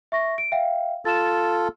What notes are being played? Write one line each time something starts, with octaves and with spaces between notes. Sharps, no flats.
E5 C#6 A#6
D7
E5 F5 G5
F4 A4 A6 E7